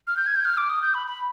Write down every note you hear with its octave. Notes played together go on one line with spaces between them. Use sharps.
F6
G6
G#6
G6
F6
D6
D#6
G6
B5
B5